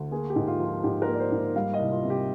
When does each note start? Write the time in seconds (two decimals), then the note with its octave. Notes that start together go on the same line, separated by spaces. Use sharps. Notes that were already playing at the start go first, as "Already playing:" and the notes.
Already playing: D2
0.11 A#3 G#4
0.30 G4
0.36 G#2
0.47 F4
0.59 F3
0.66 F4
0.83 G#2 G4
1.02 A#4
1.08 A#3
1.13 D5
1.20 C5
1.32 G#2
1.56 G3 F5
1.74 D#5
1.79 C2
1.92 F4
2.04 C3
2.10 G4